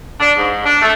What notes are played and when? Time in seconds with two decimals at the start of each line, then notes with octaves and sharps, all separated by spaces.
0.20 D4
0.37 G#2
0.65 D4
0.81 A3